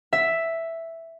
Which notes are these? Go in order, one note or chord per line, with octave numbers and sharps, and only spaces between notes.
E5